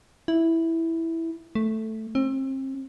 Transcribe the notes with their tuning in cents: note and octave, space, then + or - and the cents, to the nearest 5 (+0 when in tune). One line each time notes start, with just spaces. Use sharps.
E4 -5
A3 +0
C4 +35